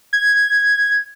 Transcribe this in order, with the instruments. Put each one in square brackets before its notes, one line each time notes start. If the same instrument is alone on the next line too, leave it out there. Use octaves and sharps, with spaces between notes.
[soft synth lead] G#6